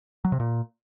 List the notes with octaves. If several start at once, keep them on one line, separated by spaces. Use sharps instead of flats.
F#3
C3
A#2